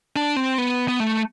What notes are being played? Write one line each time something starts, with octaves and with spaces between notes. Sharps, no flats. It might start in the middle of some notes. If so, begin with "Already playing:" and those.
D4
C4
B3
B3
A3